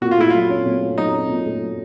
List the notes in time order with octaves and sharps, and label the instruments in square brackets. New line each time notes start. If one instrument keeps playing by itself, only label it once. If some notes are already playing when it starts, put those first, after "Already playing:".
[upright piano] A#2 [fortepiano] F#4
[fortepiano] F4
[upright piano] A3 [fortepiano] E4
[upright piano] F#3 [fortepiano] F4
[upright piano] C#4
A#2
A3
[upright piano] F#3 [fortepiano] D#4
[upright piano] C#4
A#2
A3
F#3